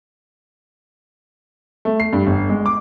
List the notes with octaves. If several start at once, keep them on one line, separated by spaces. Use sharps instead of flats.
A3
C7
G2
G1
G#3
D6